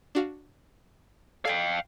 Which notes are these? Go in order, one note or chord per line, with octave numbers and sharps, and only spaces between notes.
D4 F#4 F5
A4 D5 F5 G5 G#5